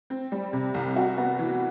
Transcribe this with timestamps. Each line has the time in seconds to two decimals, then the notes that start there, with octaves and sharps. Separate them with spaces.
0.10 C4
0.32 G3
0.53 C3
0.74 C2
0.96 F#4
1.18 B3
1.39 E3